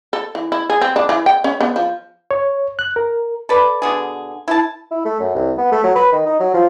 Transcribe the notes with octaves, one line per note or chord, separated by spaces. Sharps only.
A4
E3
E4
G#4
C4
D4
E3
G5
C#4
B3
F3
C#5
F#6
A#4
A4 B4 D5
B2 D3 G#4
E4 A5
E4
A3
F#2
C2
B3
A3
F#3
B4
D#3
D#4
F#3
F3